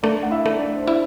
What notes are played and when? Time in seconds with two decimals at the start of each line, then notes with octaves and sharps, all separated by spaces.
0.03 A3 D4 D5
0.23 F#5
0.31 E4 E5
0.46 A3
0.59 D4 D5
0.76 C5
0.87 D4 E4 D5